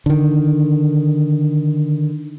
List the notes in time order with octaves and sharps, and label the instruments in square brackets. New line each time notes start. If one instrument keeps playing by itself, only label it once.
[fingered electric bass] D3 D#3